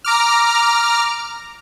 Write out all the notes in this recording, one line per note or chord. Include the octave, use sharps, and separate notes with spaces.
A#5 D6 F6